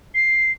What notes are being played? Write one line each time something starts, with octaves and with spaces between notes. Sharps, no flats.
C7